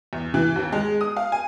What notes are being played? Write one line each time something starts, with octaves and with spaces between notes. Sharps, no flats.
E2
E3
D#2
G#3
D#6
F5
G#5